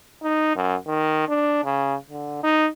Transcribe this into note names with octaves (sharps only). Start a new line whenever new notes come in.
D#4
F#2
D#3
D4
C#3
D3
D#4